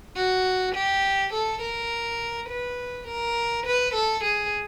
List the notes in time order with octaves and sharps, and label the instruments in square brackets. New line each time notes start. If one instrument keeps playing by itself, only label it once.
[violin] F#4
G4
A4
A#4
B4
A#4
B4
A4
G#4